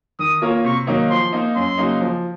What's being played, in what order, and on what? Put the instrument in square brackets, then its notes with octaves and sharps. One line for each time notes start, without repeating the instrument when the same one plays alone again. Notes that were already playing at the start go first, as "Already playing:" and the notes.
[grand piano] D#3 [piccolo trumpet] D#6
[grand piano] A#3 F4 A#4 C#5
[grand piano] C3 [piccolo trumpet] C#6
[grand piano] D#3 F#3 A#3 D#4
[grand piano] F3 [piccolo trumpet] C6
[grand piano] A#3 D#4
[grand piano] F#2 [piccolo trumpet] C6
[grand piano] C#3 F#3 A#3 D#4
F3